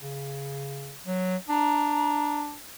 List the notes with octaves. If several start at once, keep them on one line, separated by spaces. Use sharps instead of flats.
C#3
F#3
D4 A#5